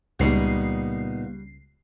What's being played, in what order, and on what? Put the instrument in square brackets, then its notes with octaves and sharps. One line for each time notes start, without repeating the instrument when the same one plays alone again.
[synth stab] C#2 C7 [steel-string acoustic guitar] A#2 B3 D#4 [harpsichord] G3 F#4